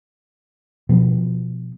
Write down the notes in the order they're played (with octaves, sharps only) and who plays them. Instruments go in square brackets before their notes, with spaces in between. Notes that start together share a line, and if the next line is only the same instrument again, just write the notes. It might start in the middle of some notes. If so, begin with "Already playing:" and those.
[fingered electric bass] B2 F3 B3